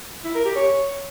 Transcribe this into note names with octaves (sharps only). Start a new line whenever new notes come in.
E4
A#4
G4
C#5